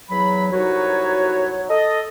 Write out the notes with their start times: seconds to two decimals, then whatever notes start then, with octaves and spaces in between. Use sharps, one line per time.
0.11 E2 F#3 B5
0.52 C2 F#3 D#4 F#4 B4 C#5
1.70 A4 D#5